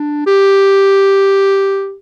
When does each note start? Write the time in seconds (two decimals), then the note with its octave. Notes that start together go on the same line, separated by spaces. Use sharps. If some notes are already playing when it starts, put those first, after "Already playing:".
Already playing: D4
0.27 G4